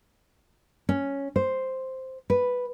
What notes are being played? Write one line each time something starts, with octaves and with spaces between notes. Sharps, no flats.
C#4
C5
B4